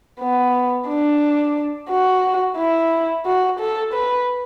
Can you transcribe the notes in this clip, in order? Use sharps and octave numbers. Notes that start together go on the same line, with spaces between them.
B3
D4
F#4
E4
F#4
A4
B4